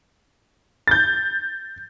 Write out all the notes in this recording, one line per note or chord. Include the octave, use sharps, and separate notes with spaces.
G6 A6